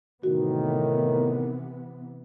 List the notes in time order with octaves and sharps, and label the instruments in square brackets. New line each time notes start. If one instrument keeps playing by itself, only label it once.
[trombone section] A2 D#3 [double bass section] C3 E3 B3 [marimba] F#4